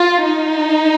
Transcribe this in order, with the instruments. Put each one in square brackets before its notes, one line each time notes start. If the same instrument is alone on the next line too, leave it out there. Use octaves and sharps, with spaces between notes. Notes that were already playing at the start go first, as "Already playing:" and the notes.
Already playing: [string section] F4
D#4